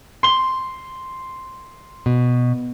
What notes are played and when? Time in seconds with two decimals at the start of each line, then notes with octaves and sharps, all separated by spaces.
0.23 C6 G7
2.06 B2